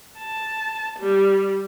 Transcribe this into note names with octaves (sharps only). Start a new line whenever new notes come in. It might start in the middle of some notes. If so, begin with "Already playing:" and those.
A5
G3